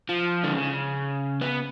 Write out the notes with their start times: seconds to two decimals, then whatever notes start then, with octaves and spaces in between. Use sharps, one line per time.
0.09 F3
0.44 D3
0.53 C#3
1.41 B3